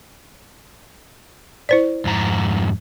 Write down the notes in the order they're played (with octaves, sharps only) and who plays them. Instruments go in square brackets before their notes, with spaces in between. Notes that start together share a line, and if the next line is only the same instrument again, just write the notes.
[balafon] E4 C5 D5
[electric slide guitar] F2 G#2 A#5